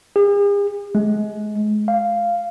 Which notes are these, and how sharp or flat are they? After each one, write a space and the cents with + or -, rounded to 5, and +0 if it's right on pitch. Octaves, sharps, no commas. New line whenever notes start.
G#4 -45
G#3 +30
F5 -10